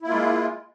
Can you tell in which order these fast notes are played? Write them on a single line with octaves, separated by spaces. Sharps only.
E4 A#3 F4 G#3